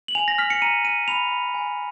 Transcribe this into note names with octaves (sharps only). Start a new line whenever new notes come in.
F#7
G#5 F7
A#6
F6 B6
C#7
A#5 D#7
A#5 D#7
B5 F7
B5
G#5